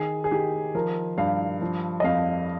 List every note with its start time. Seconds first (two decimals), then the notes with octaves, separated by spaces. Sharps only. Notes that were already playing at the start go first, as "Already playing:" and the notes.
Already playing: D#3 G#4
0.24 G#4
0.31 D#3 G4
0.75 F3 A#4
1.18 G2 F5
1.61 F3
2.00 D#5
2.04 F2 F5